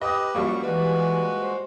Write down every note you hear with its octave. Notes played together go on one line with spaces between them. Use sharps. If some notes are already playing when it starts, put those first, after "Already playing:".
G4 B4 D#5 D#6
F#2 F3 G3 A#3 C#6
E3 G#3 F#4 B4
C5